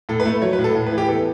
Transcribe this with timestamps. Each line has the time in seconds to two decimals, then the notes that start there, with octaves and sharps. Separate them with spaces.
0.09 A2 A4
0.20 B4
0.25 A3
0.42 F#3 C#5
0.53 B4
0.59 A2
0.64 A4
0.75 A2
0.86 B4
0.92 E3
0.98 G4
1.09 B3 A4